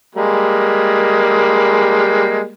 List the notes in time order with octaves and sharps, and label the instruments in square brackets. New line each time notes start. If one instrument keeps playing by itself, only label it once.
[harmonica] G3 G#3 A#3